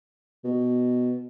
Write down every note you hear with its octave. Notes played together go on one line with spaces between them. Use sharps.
B2